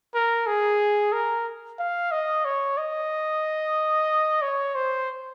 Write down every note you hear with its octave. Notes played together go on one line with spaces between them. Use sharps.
A#4
G#4
A#4
F5
D#5
C#5
D#5
C#5
C5